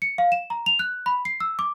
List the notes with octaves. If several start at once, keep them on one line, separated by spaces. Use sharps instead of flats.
C#7
F5
E7
A#5
F7
F#6
B5
C7
E6
D6